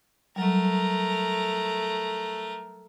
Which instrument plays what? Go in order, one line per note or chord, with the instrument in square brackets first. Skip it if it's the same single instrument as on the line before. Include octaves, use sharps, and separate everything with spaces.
[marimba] F#3 G3 [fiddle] A3 A#4